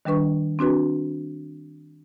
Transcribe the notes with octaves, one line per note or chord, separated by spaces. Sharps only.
D#3 G3 D4 B4 C#6
C4 D4 F#4 B4